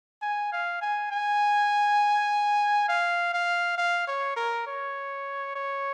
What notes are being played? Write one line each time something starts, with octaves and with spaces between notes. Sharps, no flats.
G#5
F5
G#5
G#5
F5
F5
F5
C#5
A#4
C#5
C#5